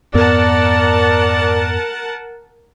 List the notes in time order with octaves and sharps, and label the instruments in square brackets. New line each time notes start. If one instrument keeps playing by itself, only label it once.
[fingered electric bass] F2 G#2 B3 [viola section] A#4 F#5 A5 [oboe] D5